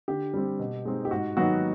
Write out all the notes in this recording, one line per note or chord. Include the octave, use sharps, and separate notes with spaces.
D3 G4
G3 C4
B2
G#3 C4 D#4
G4
G#2 F#4
D#3 F#3 B3 D#4 F#4